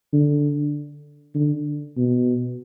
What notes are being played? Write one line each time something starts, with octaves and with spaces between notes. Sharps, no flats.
D3
D3
B2